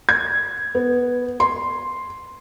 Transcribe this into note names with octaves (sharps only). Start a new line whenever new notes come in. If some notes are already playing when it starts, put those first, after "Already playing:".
G#6
B3
C6